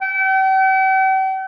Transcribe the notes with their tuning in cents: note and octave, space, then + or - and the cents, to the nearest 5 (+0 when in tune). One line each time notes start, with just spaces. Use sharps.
G5 -45